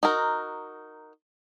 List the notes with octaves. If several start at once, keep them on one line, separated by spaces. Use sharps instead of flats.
D#4 F#4 A#4